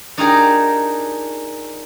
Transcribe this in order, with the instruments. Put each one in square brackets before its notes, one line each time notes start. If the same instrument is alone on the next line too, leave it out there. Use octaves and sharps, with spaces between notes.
[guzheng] D4 D#4 F4 G4 G#4 A#4